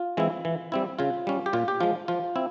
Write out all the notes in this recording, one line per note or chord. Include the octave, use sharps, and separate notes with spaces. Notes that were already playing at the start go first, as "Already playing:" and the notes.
Already playing: F4
E3 G#3 C4 E4
E3
G3 C4 E4
C#3 F4
G3 C#4
G4
A#2 F4
G4
F3 G#3 F4
F3 F4
C4 E4